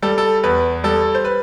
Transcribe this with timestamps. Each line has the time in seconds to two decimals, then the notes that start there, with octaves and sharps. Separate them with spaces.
0.02 G3 A4
0.18 A4
0.43 E2 B4
0.84 G3 A4
1.15 C5
1.25 B4